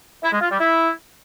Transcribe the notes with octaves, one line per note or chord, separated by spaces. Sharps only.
E4
G#3
F4
G3
E4